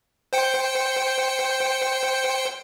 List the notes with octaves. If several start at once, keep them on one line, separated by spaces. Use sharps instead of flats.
C5 G5 C#7